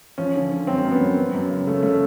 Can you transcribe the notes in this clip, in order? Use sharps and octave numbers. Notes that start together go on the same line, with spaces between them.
F3 C#4
D3
D3
F#2 C4
F#2
B3
F#2
F#2
F#2
C#3
C#3 A3
C#3 A3